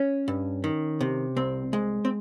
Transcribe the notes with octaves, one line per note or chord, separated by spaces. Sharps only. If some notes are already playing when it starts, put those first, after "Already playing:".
Already playing: C#4
G2
D#3
C3
C2 C4
G#3
C4